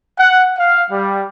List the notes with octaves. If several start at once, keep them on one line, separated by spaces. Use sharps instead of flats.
F#5
F5
G3